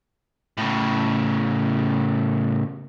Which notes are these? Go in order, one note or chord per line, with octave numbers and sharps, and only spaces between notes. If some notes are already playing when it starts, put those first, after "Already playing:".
A2 C#3